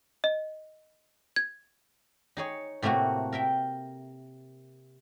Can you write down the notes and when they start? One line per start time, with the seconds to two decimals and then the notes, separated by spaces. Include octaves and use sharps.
0.24 D#5
1.36 G#6
2.37 D#4 G#4 C#5
2.82 A2 C3 A3 A#3 F#4
3.33 A#4 E5 G5